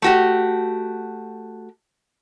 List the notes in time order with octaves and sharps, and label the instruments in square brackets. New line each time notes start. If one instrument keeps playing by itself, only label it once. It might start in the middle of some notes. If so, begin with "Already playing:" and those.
[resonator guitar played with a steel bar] A3 F#4 G4